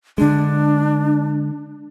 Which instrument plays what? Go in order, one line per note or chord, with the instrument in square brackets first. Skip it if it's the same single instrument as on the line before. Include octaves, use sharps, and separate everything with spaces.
[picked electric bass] D3 G#3 [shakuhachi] D4